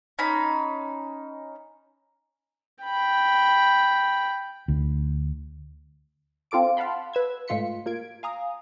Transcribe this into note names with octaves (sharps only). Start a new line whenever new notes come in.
C#4 D#4 B5
G5 B5
D2
C4 F4 A4 D6 D7
F5 F#5 A5 B5 C6
B4 E6 G#6
G#2 A3 F4 C6 B6 C#7
A#3 F4 G#6 D7
F5 G#5 A#5 D#6